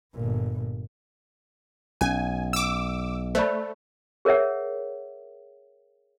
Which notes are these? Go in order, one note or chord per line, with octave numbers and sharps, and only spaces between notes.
G1 A#2
B1 C#4 G#5
D6 E6
A3 C5 D5 B5
G#4 A#4 C#5 E5 F#5